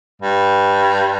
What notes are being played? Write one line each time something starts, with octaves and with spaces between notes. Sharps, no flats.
G2